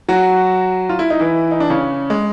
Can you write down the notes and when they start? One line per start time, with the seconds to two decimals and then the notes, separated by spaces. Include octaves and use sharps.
0.09 F#3 F#4
0.89 F4
0.99 E4
1.10 D#4
1.20 E3 E4
1.51 D#4
1.60 D4
1.70 C#3 C#4
2.10 G#3